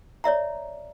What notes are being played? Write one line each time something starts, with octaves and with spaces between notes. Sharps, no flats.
C#5 D5 E5 A#5